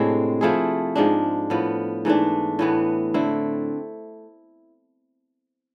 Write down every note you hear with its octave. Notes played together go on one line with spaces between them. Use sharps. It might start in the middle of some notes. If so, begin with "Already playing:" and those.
Already playing: A2 C3 G#3 C4 D4
F3 A3 E4 G#4
G#2 F3 G#3 D4
A2 F3 B3
G#2 E3 A3 D4
A2 E3 B3
D3 A3 C4 E4